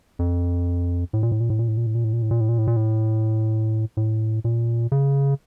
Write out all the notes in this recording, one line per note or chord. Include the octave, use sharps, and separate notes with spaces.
F2
A2
A#2
A2
A#2
A2
A#2
A2
A#2
A2
A#2
A2
A#2
A2
A#2
A2
A#2
A2
A#2
A2
A2
A#2
C#3